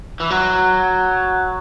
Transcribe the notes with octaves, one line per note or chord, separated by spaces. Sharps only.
E3
F#3